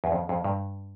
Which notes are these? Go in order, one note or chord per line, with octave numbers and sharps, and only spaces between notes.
E2
F2
F2
G2